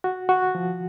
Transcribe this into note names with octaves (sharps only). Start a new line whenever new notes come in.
F#4
F#4
F3